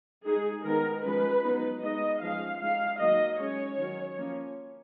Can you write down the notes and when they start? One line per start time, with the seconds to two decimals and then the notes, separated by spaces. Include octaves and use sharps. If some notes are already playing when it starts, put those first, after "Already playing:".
0.25 G#3 D#4 G#4
0.65 D#3 G#3 B3 D#4 A#4
1.04 F3 G#3 C#4 B4
1.43 F#3 B3 D#4
1.82 G#3 B3 D#4 D#5
2.21 F3 G#3 C#4 F5
2.61 G#3 D#4 F5
3.00 D#3 F#3 A#3 D#4 D#5
3.39 G#3 C#4 C#5
3.78 D#3 F#3 C#4
4.17 F3 A#3 C#4